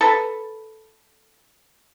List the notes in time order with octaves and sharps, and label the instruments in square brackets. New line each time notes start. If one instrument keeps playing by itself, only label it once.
[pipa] A4 B4